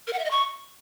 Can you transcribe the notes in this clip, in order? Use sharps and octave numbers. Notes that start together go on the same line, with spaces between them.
A#4
F#5
E5
D#5
C#6